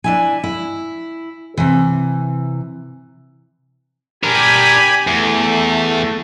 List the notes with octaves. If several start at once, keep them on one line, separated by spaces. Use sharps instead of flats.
D4 E4 G#5
E4
C3 E3
D4 G4 A#4 G#5 B5
E2 A3